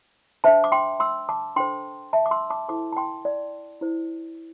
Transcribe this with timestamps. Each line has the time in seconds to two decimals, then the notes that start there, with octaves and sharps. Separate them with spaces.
0.44 D4 C5 E5 A5
0.64 D6
0.72 G5 C6
1.00 C6 E6
1.29 A5 D6
1.56 D4 A4 C5 G5 C6
2.13 E5 A5
2.26 D6
2.31 C6 E6
2.50 A5 D6
2.69 E4 A4 C5 A5 D6
2.93 A5
2.97 G5 C6
3.25 D5
3.81 E4 C5